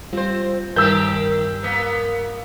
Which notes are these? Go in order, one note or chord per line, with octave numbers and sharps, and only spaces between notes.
G3 C4 F4 C5
G2 D#3 G3 G4 A#4 E6 G6
A#3 B3